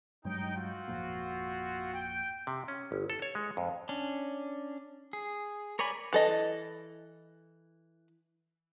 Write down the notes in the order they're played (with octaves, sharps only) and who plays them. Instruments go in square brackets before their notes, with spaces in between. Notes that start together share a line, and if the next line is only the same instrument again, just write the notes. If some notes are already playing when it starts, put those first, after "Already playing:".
[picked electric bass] G2 F#3 G#3 [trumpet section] D#4 G5
[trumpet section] C4 F4 F#4
[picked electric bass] G#1 F2 A#2
[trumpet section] G5
[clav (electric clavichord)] C3
C#4
G1
A4
C#5
G#3
F2
[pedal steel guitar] C#4 D4
G#4
A#4 C#5 D5 G#5 B5
[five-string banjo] E3 A4 D#5